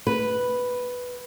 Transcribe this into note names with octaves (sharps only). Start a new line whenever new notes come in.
B4